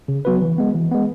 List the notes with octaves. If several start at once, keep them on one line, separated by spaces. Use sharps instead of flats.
C#3
F#3 B3 F#4 B4
E3
G#3 B3
E3
G#3 B3